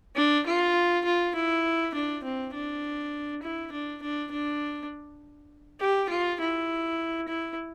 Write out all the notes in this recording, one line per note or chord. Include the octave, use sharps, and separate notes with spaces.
D4
F4
F4
E4
D4
C4
D4
E4
D4
D4
D4
G4
F4
E4
E4